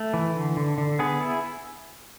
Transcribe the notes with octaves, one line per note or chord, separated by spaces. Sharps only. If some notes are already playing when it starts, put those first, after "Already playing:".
Already playing: A3
E3
D3
D3
D3
B3 G#4
E4